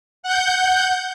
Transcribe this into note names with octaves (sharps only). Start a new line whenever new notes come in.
F#5 G6